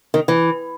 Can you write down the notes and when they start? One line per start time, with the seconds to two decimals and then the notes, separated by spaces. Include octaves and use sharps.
0.14 D#3
0.28 E3